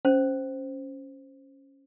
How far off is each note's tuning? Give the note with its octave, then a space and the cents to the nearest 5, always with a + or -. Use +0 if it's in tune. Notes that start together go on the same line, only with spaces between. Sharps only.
C#4 -5 C5 +0